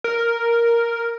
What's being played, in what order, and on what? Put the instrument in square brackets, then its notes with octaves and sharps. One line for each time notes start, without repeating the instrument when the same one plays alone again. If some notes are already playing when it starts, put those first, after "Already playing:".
[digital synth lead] A#4